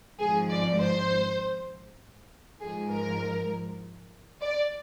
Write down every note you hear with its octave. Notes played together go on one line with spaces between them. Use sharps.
G#1 G#2 F3 G#4
D5
C5
G#2 F3 G#3 G#4
A#4
D5